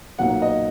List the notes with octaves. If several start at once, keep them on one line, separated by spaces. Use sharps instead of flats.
B1 A#2 F#3 A#3 F#5
D#5